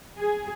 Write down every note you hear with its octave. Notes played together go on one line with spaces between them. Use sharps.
G#4